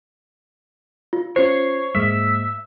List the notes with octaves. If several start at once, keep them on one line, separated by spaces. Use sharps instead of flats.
F4
C#4 F4 C5 C#5 C7
G#2 G#3 A#3 E5